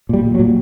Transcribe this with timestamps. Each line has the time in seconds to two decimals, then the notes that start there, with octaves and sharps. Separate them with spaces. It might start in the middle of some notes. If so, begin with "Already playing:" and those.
0.09 A#2 G3
0.24 A#2
0.35 F#3
0.39 A#2